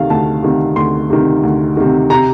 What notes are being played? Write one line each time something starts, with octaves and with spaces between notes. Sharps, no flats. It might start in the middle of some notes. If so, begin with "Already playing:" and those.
Already playing: D2 C3 D#3 F5
D2 A5
C3 D#3
D2 C6
C3 D#3
D2
C3 D#3
C3 A#5